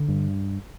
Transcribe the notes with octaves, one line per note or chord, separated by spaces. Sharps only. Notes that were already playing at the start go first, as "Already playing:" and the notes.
Already playing: D3
G2